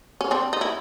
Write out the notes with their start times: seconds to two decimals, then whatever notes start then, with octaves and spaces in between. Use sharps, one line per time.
0.21 C#4
0.31 C4 D4
0.53 D#4
0.61 E4